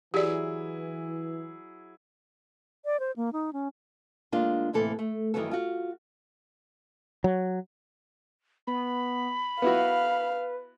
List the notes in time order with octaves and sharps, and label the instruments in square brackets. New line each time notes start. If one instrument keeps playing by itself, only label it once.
[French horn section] E3 [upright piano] F#3 E4 G#4 [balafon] G4 D5
[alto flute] D5
C5
A#3
D#4
C#4
[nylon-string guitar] D3 G#3 A#3 D4 F4
D2 A2 C3 E3 A#3 A4
A3
G2 D#3 E3 F#3 B3 A4
F4 F#4
[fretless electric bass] F#3
[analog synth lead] B3 [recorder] B5
[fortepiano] B3 E4 F#4 [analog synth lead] B4 [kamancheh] F5